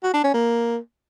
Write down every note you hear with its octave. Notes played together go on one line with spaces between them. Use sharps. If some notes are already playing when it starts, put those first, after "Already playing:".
F#4
D4
C#4
A#3